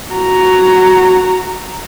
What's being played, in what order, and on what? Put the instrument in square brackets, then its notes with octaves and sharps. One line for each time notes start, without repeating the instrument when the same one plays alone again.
[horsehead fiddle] F#4 A#5